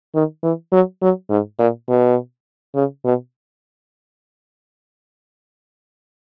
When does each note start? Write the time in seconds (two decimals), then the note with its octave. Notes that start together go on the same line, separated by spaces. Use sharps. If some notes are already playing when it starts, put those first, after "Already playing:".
0.15 D#3
0.43 E3
0.72 F#3
1.02 F#3
1.30 G#2
1.59 A#2
1.89 B2
2.75 C#3
3.05 B2